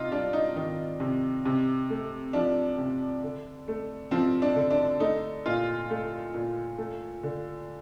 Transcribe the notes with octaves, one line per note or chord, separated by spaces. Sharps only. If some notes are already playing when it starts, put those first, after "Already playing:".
Already playing: C3 D#4 F4
G3 D4
D#4
D#3 D#4
C3
C3
A3
F3 D4
C3
D3
A3
F3 C4
D4
D3
D4
A3 D#4
A#2 F4
A3
A#2
A3
D3